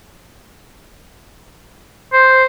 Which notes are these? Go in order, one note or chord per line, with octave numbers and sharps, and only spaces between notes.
C5